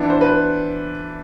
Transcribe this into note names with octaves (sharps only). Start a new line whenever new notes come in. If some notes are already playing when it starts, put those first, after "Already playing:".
Already playing: E3 B3 D4
C5
B4